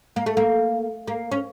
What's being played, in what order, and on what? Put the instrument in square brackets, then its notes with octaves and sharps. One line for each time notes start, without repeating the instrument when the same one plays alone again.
[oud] A#3
A3
A#3
A#3
C#4